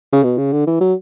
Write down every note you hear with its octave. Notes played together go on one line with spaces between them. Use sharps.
C#3
B2
C#3
D3
E3
F#3